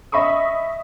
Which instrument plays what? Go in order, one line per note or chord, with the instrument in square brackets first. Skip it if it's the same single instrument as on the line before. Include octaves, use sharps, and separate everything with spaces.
[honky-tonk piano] D#5 E5 B5 C#6 D#6